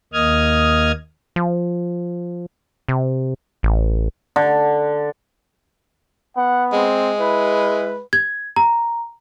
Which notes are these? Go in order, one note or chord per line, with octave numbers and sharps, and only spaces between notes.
D#2 A#3 D#5 D#6 F6 G#6
F3
C3
A1
D3
B3 F#5
G#3 C4
E4 B4
G#6
A#5